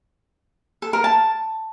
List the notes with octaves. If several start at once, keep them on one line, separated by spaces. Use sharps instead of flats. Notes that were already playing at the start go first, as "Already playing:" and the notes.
A4
A#4
A5